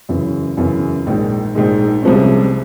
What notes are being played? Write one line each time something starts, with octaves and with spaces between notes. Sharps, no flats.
F#2 C#3 E3
F#2 C#3 E3
A#1 G#2 D#3 G#3
A#1 G#2 D#3 G#3
C2 C3 F3 G#3 C#4